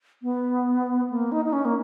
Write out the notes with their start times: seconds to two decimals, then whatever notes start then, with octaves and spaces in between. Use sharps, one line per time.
0.23 B3
1.10 A#3
1.32 D#4
1.45 D#4
1.53 C#4
1.65 A#3